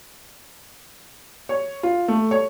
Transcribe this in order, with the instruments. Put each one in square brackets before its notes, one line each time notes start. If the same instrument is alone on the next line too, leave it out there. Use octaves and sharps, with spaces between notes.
[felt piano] C#5
F4
A3
C#5